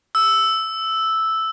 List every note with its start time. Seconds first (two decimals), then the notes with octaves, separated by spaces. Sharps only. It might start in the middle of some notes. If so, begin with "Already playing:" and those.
0.15 E6